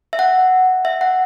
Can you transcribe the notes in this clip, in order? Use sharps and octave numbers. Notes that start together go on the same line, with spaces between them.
E5
F#5
E5
F#5